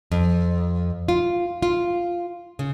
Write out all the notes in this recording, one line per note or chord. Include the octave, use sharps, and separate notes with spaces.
F2
F4
F4
C#3